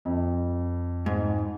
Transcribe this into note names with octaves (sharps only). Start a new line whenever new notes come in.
F2
G#2